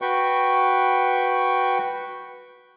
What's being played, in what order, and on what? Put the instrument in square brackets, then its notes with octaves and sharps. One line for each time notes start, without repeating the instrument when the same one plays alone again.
[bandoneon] F#4 B4 G5 C#6